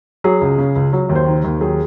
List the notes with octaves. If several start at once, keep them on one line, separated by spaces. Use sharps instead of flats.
F#3 G#4
C#2
C#3
C#2
F#3
D#2
C5
D#3
D#2
F#3 G#4